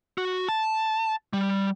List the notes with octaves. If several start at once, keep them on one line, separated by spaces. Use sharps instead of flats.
F#4
A5
G3